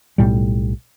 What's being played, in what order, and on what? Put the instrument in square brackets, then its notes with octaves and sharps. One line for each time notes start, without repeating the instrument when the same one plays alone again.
[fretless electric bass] B1 A2 G3